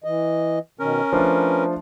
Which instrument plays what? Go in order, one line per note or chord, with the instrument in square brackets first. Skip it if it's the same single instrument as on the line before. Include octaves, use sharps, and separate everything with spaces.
[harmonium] E3 D#5
[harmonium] B2 D#3 [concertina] C#4 A#4
[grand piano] F3 A3 D4 [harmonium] B4